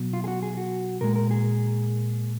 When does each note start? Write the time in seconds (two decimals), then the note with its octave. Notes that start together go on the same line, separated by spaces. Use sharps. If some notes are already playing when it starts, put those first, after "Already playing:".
Already playing: B2 F#3
0.14 F4
0.24 G#4
0.28 F#4
0.43 G#4
0.57 F#4
1.01 A#2 G#3 A#4
1.16 A#4
1.31 G#4